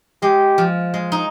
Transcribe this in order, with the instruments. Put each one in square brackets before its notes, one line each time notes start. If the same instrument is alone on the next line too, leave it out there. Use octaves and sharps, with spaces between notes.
[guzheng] G#3 [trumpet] G4
[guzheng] F3
G#3
D#4